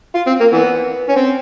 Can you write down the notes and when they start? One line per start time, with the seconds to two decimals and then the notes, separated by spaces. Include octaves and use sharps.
0.15 F4
0.27 C4
0.40 A#3
0.52 E3 B3
1.09 C#4
1.16 C4